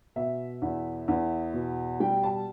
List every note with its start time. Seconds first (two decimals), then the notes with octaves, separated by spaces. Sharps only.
0.16 B2 E5
0.62 E2
1.08 E2
1.54 B2
2.00 G3 G5
2.23 A5